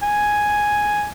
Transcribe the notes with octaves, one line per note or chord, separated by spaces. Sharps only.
G#5